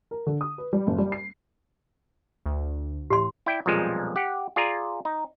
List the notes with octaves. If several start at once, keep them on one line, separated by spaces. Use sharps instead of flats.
A#4
D3
D#6
B4
G3
F#1
G3
C7
D2
A2 G4 C6
E4 D5 G5
B1 F2 A#2 F3 G3 G#3
G4 F#5
F4 G#4 D5 G#5 A#5
D#4